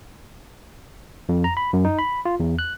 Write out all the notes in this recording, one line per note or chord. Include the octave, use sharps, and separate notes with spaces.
F2
A#5
B5
F#2
D#4
B5
F4
E2
F#6